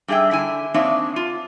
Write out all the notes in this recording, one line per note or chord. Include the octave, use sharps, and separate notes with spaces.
G2 G3 G#4 E5 G5
D3 E4 G#5
A#3 C4 D4 D#4 C#5 E5
F4